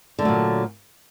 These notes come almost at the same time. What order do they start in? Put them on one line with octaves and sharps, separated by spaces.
D3 A3 F#3 A#2